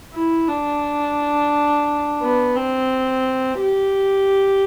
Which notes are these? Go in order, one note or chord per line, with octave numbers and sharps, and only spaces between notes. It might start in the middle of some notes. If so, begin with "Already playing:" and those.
E4
D4
B3
C4
G4